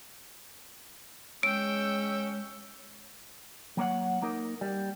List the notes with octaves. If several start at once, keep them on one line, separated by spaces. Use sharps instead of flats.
G#3 C#4 G5 E6 D7
F#3 A#3 C#5 F#5
A#3 D#4 A#4
G3